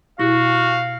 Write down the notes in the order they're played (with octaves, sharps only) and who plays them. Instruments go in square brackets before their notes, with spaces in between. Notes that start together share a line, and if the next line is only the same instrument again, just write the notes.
[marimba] B2 E4 G4 [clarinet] F#4 [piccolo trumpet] F5